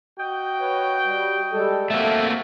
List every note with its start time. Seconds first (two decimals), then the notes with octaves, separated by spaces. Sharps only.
0.18 F#4 D#5 G5
0.61 B4 C#5
1.05 G3
1.53 G3 G#3 A4
1.90 A3 A#3 C4 F#4 A4 E5